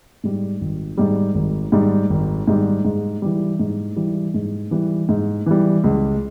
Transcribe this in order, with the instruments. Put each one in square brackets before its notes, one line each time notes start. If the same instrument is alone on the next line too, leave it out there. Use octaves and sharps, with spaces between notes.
[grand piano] G#2 G3
G#1
G#2 G3
G#1
G#2 G3
G#1
G#2 G3
G#2
E3 G3
G#2
E3 G3
G#2
E3 G3
G#2
E3 G3
C#2